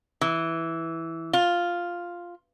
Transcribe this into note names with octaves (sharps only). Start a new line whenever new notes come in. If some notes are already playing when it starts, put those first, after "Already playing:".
E3
F4